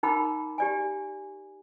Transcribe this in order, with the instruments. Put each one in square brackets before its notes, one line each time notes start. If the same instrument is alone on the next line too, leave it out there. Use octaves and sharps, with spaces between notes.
[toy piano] D#4 A#4 G5 A#5 B5 D6
G4 D5 G#5